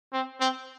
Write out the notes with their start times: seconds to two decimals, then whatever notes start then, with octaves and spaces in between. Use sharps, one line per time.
0.13 C4
0.40 C4